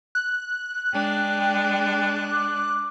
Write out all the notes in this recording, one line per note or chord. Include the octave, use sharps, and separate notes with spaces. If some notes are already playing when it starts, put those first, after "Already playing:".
F#6
G#3 D4 G5
D6